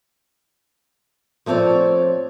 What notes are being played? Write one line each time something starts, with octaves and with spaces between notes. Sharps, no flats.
F3 A3 C4 C#5 D5